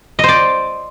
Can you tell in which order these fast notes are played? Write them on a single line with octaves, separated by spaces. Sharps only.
D#5 C5 D5